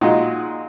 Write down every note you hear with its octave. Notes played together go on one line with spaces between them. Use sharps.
A#2 G#3 D#4 F#4